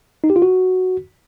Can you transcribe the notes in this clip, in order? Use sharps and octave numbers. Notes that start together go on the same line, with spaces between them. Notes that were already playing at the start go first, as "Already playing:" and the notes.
D#4
G4
F4
F#4